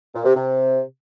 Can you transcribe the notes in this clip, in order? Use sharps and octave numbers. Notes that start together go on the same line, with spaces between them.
A#2
C3
C3